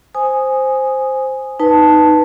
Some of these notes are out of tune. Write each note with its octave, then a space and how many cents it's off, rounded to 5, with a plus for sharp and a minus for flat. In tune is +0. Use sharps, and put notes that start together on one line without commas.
C5 +0 G#5 +0 D#6 -5
D#4 +0 B4 +0 A5 +0